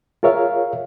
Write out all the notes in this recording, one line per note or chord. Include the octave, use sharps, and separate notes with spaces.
F4 G#4 A#4 C#5 E5 F5